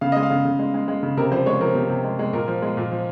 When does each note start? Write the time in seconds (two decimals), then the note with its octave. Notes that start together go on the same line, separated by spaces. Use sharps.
0.01 C#3 F5
0.12 G#3 D#5
0.23 F5
0.30 C#3
0.45 C#3
0.59 G#3
0.74 G#3
0.88 G#3
1.03 C#3
1.17 C3 A#4
1.32 F3 C5
1.46 G#3 C#5
1.61 F3 A#4
1.75 C3
1.89 C3
2.04 G#3
2.19 G#3
2.33 A#2 A#4
2.48 F3
2.62 G#3
2.77 A#2
2.91 F3